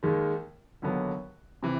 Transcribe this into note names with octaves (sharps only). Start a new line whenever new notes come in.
D#2 D#3 G#3
D#2 D3 F#3 B3
C3 E3